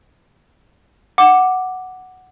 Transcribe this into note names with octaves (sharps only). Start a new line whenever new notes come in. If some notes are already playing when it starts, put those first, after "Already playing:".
F#5 D6